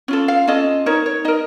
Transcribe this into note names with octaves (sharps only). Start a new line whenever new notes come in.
C#4 F4 A4
F5
C#4 F4 A4 D#5
D#4 A#4 C#5
C#5
D#4 A#4 D#5